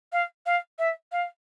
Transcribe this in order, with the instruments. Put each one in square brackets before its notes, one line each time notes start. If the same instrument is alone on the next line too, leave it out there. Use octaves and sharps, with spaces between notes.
[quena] F5
F5
E5
F5